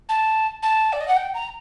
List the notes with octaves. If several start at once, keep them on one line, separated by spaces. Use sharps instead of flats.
A5
A5
D5
D#5
F#5
G5
A#5